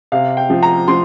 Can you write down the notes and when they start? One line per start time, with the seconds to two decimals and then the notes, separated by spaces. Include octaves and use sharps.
0.12 C3 F5
0.37 G5
0.50 F3
0.63 A#5
0.88 F3 C6